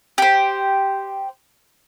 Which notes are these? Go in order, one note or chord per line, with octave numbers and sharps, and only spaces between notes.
G4 C5